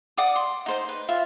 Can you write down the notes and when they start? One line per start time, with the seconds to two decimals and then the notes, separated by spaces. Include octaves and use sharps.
0.17 D5 F#5 D6 D#6
0.36 C6
0.66 D#4 C5 C6
0.89 B4
1.08 F4 E5